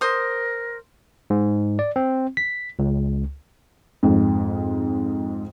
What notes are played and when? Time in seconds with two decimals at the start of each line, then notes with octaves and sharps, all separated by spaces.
0.01 A#4 C5 D#6
1.30 G#2
1.79 D5
1.96 C4
2.37 B6
2.79 C#2
4.03 F2 G#2